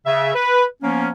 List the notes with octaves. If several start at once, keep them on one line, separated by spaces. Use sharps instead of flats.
C#3 E5
B4
F3 A#3 B3 C#4